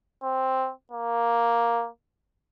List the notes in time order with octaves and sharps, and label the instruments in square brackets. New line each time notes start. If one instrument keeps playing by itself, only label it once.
[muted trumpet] C4
A#3